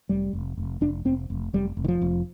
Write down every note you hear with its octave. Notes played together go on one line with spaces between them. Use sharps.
F1 G3
F1
F1
F1 D4
F1 C4
F1
F1 G3
F1
D#3
F3
F1